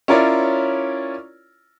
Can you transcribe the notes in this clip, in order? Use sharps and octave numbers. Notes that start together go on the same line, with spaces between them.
C#4 E4 F4 A#4 C#5 D5